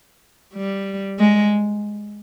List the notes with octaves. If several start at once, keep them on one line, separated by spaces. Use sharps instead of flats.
G3
G#3